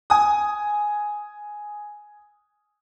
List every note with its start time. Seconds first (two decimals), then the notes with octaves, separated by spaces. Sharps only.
0.10 G#5 D#6